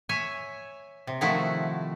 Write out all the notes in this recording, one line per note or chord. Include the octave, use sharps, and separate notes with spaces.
C#5 E5 G#5
C3
D#3 F3 A3 E4 F#4